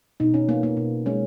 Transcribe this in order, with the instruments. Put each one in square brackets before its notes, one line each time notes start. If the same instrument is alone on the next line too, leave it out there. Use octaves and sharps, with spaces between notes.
[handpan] B2 D#4
C#4
A#3 B3
A#3
B2 B3
G#3 C#4